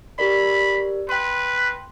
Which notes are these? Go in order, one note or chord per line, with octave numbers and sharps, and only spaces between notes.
G4 A#4 D5 B5
B4 G5 C6